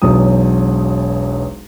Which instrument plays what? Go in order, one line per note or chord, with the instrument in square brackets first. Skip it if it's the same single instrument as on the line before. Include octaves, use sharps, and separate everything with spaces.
[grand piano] E1 B1 F#3 D#6